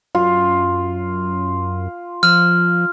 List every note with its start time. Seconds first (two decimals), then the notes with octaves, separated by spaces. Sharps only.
0.15 F#2 F4
2.23 F3 F6